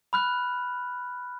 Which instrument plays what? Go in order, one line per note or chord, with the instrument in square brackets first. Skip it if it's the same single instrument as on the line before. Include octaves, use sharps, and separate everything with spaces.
[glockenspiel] B5 F6 F#6